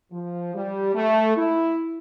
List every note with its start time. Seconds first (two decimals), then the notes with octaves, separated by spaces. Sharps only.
0.12 F3
0.54 G3
0.95 A3
1.37 E4